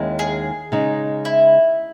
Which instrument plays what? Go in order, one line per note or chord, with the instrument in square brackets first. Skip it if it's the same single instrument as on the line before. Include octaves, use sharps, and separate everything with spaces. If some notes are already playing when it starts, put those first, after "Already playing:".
Already playing: [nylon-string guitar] D#2 D#3 G#3 C#4 E4
[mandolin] G#4
[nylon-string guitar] C#3 G#3 D#4
[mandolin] E4